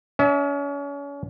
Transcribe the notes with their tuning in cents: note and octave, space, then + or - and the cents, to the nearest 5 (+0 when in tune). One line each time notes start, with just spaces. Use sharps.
C#4 +35 E5 -30